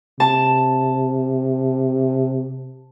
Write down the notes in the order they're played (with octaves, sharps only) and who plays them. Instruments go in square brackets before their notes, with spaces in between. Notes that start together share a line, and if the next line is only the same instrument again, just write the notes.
[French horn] C3 [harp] A5